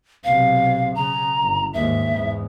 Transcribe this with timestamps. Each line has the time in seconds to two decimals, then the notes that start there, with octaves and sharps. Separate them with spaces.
0.24 B1 C3 F5
0.95 C#3 A#5
1.42 G1
1.74 D#2 G#2 E5
2.16 E2 G#2